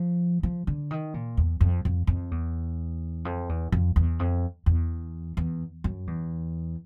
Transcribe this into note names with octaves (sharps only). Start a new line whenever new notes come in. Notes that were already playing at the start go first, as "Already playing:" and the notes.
Already playing: F3
F3
D3
D#3
A#2
E2
F2
F2
F2
E2
F2
E2
F2
E2
F2
E2
E2
F#2
E2